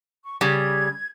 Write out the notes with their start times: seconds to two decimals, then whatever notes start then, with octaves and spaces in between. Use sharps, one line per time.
0.25 C#6
0.41 C#3 G3 G#6